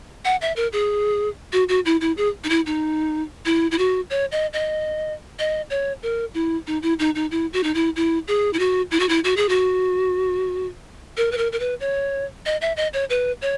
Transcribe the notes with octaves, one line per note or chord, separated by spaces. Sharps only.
F#5
E5
A#4
G#4
F#4
F#4
E4
E4
G#4
D#4
E4
D#4
E4
E4
F#4
C#5
D#5
D#5
D#5
C#5
A#4
E4
D#4
E4
D#4
D#4
E4
F#4
D#4
E4
E4
G#4
E4
F#4
E4
F#4
E4
F#4
G#4
F#4
A#4
B4
A#4
A#4
B4
C#5
D#5
E5
D#5
C#5
B4
C#5